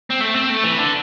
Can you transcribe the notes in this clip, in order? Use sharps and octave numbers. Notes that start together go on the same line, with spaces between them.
C4
A3
C4
A3
E3
D3